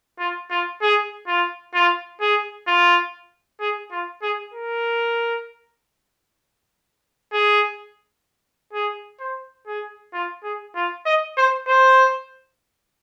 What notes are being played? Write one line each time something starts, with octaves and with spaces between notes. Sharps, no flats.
F4
F4
G#4
F4
F4
G#4
F4
G#4
F4
G#4
A#4
G#4
G#4
C5
G#4
F4
G#4
F4
D#5
C5
C5